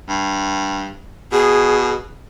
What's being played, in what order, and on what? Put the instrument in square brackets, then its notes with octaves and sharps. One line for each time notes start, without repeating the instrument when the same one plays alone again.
[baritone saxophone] G2
[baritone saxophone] B2 [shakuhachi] G#4